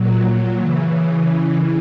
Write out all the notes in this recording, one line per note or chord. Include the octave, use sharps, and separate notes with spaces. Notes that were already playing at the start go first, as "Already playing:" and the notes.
Already playing: A#2 F#3
A#2 F#3
C#3 E3